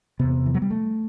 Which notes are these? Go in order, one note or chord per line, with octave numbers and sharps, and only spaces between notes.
E2 C3 B3
E3
F#3
G3
A3